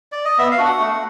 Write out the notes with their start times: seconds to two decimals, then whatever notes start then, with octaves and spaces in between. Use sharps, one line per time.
0.12 D5
0.25 D#5
0.38 B3 E5
0.51 F5
0.58 D4 F#4
0.65 F#5
0.80 A3